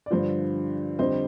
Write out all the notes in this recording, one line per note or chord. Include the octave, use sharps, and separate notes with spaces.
D5
G2 D3 F3 C5
F2 D3 G3 C5 D#5